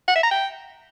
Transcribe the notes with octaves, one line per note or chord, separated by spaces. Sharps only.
F#5
E5
A#5
G5